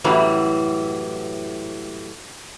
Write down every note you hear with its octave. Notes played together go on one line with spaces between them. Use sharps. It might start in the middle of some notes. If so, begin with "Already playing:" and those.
F#2 A2 E3 F#3 G3